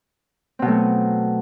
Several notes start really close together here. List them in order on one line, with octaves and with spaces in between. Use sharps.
C4 B2 F#3 A3